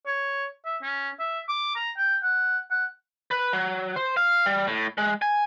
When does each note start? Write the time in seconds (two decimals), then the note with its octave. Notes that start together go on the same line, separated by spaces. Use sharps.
0.07 C#5
0.66 E5
0.83 C#4
1.20 E5
1.48 D6
1.76 A#5
1.98 G5
2.23 F#5
2.71 F#5
3.31 B4
3.53 F#3
3.96 C5
4.17 F5
4.46 G3
4.67 A2
4.98 G#3
5.22 G#5